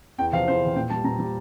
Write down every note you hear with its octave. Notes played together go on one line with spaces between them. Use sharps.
E2 G5
C3 F3 F5
E2 C5
C3 F3
A#2 G5
G3 A5
A#2 A#5
G3